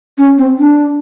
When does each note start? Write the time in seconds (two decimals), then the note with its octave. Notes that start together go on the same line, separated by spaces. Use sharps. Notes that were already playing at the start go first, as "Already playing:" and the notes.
0.18 C#4
0.38 C4
0.59 D4